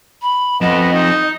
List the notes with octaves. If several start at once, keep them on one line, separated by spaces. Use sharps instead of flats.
B5
F2 B3 D#5
D#4